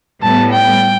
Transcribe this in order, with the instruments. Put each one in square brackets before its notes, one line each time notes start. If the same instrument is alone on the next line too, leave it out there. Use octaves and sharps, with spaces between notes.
[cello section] A2 G3 B3 [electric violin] A5
[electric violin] G5